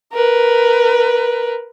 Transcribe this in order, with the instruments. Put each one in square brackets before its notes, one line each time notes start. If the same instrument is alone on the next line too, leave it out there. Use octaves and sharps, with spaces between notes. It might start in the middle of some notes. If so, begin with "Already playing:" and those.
[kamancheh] A#4 B4